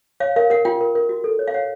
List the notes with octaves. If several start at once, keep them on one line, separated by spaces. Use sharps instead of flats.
C#5 F5
A#4 F5
A#4 F#5
F4 G5
A#4
A#4
F#4
A4
C#5
F5
C#5 F#5